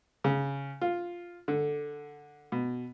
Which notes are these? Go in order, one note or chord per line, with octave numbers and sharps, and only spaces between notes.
C#3
F4
D3
B2